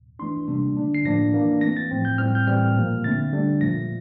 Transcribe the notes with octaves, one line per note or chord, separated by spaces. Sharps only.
E3 A3 D4 C6
C3 G3 A#3 D4
D3 A3 D4
C7
A2 F3 A#3 D4 A#6
E3 A#3 D4
E3 A3 C4 A#6
A6
A2 F3 C4
G6
A2 G3 C4 F6
G6
A2 E3 G3 C4 F6
A#2 F3 A#3
D3 A3 C4 A6
D3 G3 D4
A#2 F3 A3 A#6